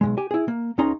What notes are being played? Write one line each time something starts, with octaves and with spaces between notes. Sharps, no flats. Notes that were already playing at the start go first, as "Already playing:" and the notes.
B1 G#2 G#3
G4 G#5
E4 G#4
A#3
C#2 C#3 C#4 D#4 A#5 C6